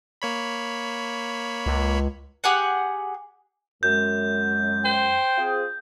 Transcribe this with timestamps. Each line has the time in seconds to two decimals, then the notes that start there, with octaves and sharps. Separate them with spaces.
0.22 A#3 C#5 B5
1.66 C#2
2.44 G4 G#4 F#5
3.83 F#2 G#3 G6
4.85 C5 G5
5.37 C4 F4 G#4